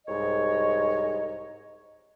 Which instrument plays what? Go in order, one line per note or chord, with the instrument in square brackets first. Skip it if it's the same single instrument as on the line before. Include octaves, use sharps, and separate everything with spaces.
[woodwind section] C2 G#2 C#5 D#5